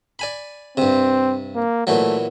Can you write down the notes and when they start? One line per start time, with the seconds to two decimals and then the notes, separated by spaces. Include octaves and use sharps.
0.19 D5 G#5 B5
0.77 G2 C3 C4
1.55 A#3
1.87 A#2 E3 F#3 A3